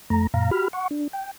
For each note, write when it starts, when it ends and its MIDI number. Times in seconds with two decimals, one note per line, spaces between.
0.10 0.27 41
0.10 0.27 57
0.10 0.27 82
0.34 0.50 42
0.34 0.50 46
0.34 0.50 77
0.34 0.50 82
0.51 0.68 66
0.51 0.68 67
0.51 0.68 83
0.51 0.68 89
0.73 0.88 78
0.73 0.88 85
0.91 1.08 62
1.13 1.31 79